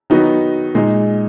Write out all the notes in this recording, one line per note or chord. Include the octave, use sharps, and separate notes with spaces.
D#3 F#3 B3 D#4 F#4
A#2 G#3 D#4